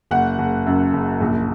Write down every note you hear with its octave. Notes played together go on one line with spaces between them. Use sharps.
F#1 F#5
F#1
F#2
F#1
A#1